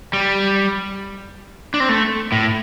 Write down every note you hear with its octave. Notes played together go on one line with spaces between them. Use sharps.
G3
D4
C4
A3
A2